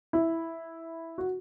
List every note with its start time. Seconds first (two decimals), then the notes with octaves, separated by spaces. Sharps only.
0.13 E4
1.18 F#4